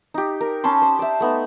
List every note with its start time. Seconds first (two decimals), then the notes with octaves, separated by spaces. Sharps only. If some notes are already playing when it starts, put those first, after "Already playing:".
0.14 D#4 G4
0.41 A#4
0.64 C#4 A5 B5 C6
0.82 C5
0.99 D5 E5
1.20 A3 B3 D#4